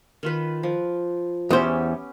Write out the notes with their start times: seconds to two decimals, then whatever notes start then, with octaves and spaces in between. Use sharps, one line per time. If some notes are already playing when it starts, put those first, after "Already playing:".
0.23 D#3 F4 B4
0.63 F3
1.50 E2 B3 C#4 G4 C5